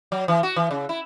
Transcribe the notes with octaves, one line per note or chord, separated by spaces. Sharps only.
F#3
E3
F#4
E3
C#3
E4